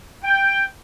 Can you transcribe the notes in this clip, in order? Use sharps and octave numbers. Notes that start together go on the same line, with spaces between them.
G5